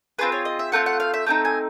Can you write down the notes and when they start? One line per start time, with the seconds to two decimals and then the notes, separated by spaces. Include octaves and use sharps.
0.19 C4 F4 G#4 B4
0.32 C#5
0.45 D#5
0.59 E5
0.72 A3 C4 F4 F#5
0.86 F#5
1.00 F5
1.14 E5
1.26 A3 C4 D#4 G5
1.45 G#5